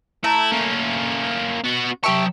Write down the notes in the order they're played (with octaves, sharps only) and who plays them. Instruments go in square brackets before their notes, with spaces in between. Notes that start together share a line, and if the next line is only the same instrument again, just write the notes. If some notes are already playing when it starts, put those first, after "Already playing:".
[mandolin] A3 A#5 [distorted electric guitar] E4
[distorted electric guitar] A#3 C#4
B3 F#4
[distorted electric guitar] F#3 A5 [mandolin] G4 E5 C#6